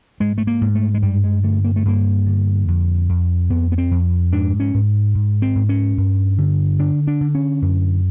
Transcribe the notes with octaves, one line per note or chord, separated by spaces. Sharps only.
G#2 G#3
A3
A#3
G#2
A3
G#3
G2 G3
G#3
D3 A3
A#3
A3
G2 A#3
D3
F2
F2
F2 B3
B3
C4
F2
G#2 D4
C#4
G#2
G#2
C4
G#2
C#4
G2
D3
D3 D4
D4
D3
C#4
F#2